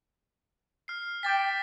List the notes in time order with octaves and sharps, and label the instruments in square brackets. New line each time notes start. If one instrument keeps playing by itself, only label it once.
[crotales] F6 C7
[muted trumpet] G5 [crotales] D6 A6 B6